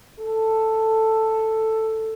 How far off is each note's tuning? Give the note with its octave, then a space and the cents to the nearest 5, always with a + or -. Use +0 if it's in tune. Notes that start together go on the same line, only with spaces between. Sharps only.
A4 +5